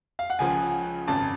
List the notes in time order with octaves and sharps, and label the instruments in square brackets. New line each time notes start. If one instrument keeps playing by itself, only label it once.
[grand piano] F5
F#5
[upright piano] C#2 C#3 F3 [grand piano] G#5
[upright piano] G#1 F#2 C#3 [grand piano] A5